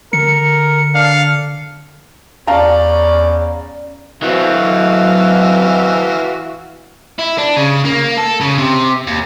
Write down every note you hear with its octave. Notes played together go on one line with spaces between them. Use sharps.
D3 A#4 C#7
D4 F5
E2 C#4 D5 F5 A5 A#5
E3 F#3 C4 F#4 F5
E4
D4
C#3
A#3
A4
C#3
C3
D#2